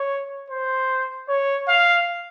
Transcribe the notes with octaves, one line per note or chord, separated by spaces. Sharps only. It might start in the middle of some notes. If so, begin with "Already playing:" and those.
Already playing: C#5
C5
C#5
F5